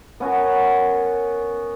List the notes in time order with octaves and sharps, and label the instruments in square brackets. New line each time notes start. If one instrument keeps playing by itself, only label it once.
[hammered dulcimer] B3 C#4 F#4 A#4